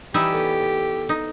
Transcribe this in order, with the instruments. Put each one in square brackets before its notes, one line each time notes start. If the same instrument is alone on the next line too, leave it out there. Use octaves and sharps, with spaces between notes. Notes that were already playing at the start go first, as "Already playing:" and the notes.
[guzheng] E3 G3 [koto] D#4 E4 E5 [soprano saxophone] G4
[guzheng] A3 B3
[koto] D#4